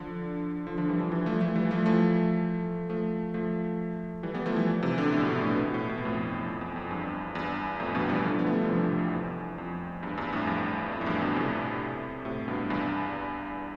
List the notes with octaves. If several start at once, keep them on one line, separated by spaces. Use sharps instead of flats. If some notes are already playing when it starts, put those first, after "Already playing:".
Already playing: D3 F3
D3 F3
D3 F3
E3 G3
D3 F3
E3 G3
F3 A3
F3 A3
E3 G3
F3 A3
F3 A3
F3 A3
F3 A3
E3 G3
G3 B3
F3 A3
E3 G3
C3 E3
B2 D3
A2
B2
A2
B2
A2
B2
A2
B2
A2
B2
A2
B2
F2 A2
E2
F2
E2
F2
E2 G2
E2 G2
F2 A2
G2 B2
E3 G3
D3 F3
B3
A3
G3
F3
C3 E3
A2 C3
F2
E2
F2
E2 G2
E2 G2
F2 A2
E2 G2
F2
A2
E2 G2
G2 B2
A2 C3
A2 C3
G2 B2
E2 G2